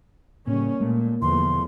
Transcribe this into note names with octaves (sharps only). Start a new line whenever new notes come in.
A2 C#3 G3 A#3 C#4
A#2 G#3 A3
E1 E2 D3 F3 A3 C6